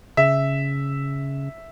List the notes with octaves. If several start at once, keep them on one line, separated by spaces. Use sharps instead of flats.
C#3 E5